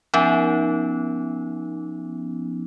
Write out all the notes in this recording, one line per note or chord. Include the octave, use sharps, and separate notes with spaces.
F3 B3 C#4 D#4